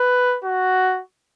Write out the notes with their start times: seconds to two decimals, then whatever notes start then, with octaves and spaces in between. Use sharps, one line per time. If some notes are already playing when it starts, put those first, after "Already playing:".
Already playing: B4
0.44 F#4